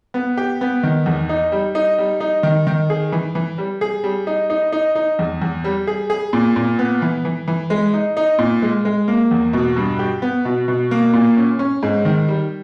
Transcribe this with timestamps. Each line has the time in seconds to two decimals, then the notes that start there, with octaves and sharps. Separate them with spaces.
0.14 B3
0.37 G4
0.61 B3
0.83 D#3
1.06 E2
1.29 D#4
1.52 G3
1.75 D#4
1.98 G3
2.20 D#4
2.43 D#3
2.67 D#3
2.90 G#4
3.12 E3
3.35 E3
3.58 G3
3.81 G#4
4.04 G3
4.27 D#4
4.50 D#4
4.72 D#4
4.95 D#4
5.19 E2
5.42 E2
5.64 G3
5.87 G#4
6.10 G#4
6.33 A#2
6.56 A#2
6.79 B3
7.02 E3
7.25 E3
7.48 E3
7.70 G#3
7.93 D#4
8.17 D#4
8.39 A#2
8.62 G#3
8.85 G#3
9.08 A#3
9.31 E2
9.53 B2
9.76 G2
9.99 G4
10.22 B3
10.45 B2
10.68 B2
10.91 A#3
11.13 A#2
11.37 C#4
11.59 C#4
11.83 G#2
12.05 D#3
12.28 G3